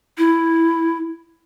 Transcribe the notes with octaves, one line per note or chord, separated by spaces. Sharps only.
E4